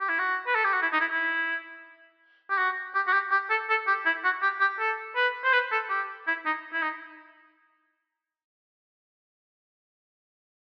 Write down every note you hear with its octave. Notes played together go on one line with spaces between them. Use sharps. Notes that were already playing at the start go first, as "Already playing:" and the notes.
G4
E4
F#4
B4
A4
G4
F#4
E4
D#4
E4
E4
G4
F#4
G4
F#4
G4
G4
A4
A4
G4
E4
F#4
G4
G4
A4
B4
C5
B4
A4
G4
E4
D#4
E4
D#4